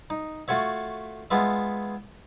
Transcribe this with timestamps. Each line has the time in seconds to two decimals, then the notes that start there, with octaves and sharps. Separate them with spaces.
0.10 D#4
0.48 A3 F4 F#4 C#5 E5
1.30 G#3 B3 F4 E5